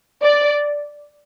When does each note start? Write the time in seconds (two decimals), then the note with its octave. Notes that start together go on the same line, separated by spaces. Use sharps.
0.22 D5